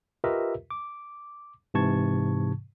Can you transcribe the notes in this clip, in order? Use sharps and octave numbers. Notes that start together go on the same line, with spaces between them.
F4 G4 A#4 B4 D#5 E5
D6
G#2 C3 E3 A5 C#6 G#6